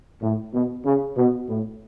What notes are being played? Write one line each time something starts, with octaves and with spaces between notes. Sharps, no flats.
A2
B2
C#3
B2
A2